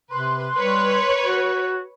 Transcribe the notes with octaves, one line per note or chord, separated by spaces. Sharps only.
C3 B4 C6 F#6
G3 B4 C#5
F#4